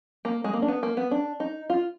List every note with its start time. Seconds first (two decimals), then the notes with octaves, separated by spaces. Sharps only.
0.25 A#3
0.44 G#3
0.53 A#3
0.62 D4
0.68 B3
0.83 A#3
0.97 B3
1.11 D4
1.40 D#4
1.70 F4